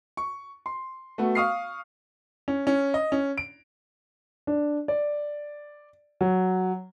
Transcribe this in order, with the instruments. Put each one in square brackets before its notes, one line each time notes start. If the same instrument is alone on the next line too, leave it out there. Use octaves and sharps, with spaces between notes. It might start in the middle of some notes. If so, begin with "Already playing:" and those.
[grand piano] C#6
C6
A3 B3 F#4
F5 C#6 D#6 F6 C7
[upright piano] C#4
C#4
D#5
C#4
D7
[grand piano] D4
D5
F#3